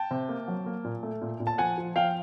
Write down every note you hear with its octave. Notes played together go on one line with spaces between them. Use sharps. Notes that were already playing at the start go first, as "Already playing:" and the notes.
Already playing: G5 A5
C3
A#3
F#3
A#3
A#2
A3
A#2
A#2
A5
F3 F#5 G#5
F3
F3 F5 G5